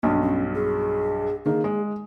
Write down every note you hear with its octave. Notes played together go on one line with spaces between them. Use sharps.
B1 G2 D4
C#4
G#4
D#3 A#3 G#4
G#3